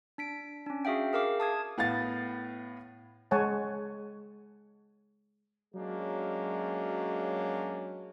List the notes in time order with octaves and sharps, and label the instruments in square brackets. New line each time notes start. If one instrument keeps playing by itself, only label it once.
[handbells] D4 B6 D7
C#4 D4
F#4 G#4 E5 F5 G5
G#4 A#4 F5 D6
A5 D#6 G#6
[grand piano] A2 B3 F5 A6
[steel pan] G#3 C#5 F#5 G#5 A5
[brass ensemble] F#3 G#3 A#3 C#4 D4